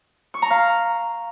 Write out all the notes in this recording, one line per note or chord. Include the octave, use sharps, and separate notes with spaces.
C#6
A#5
F5